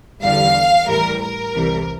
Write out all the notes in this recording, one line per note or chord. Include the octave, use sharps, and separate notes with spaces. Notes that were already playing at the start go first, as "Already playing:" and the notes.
E2 D3 G3 F5
A2 E3 G3 A#4
A#4
C2 C3 E3 G3